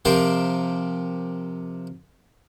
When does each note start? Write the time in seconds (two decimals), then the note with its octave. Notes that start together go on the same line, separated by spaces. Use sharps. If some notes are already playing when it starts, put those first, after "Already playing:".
0.05 C3 F3 G4 A#4 C6